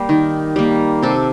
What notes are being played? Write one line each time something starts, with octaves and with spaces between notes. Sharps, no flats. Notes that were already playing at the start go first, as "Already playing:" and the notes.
Already playing: G3 A#3 G4
D#3
G3 A#3
C3 A4